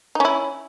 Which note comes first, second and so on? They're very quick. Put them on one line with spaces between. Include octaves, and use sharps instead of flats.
D#4 C#4 E4